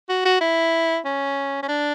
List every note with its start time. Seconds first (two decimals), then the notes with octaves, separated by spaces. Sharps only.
0.09 F#4
0.25 F#4
0.41 E4
1.05 C#4
1.63 C#4
1.68 D4